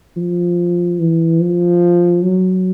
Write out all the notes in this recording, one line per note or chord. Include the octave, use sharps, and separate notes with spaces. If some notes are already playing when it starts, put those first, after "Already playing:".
F3
E3
F3
F#3